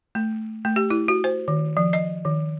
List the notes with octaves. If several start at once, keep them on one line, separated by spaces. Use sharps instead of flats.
A3
A3
G4
E4
F#4
C5
D#3
F3
D#5
D#3